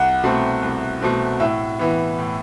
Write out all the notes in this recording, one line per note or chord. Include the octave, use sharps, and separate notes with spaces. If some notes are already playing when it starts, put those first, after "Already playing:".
Already playing: C2 F#5
B2 A3 C4
C2
B2 A3 C4
A2 E5
E3 B3
A2